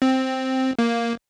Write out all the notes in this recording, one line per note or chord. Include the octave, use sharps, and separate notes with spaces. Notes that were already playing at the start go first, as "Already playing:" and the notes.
C4
A#3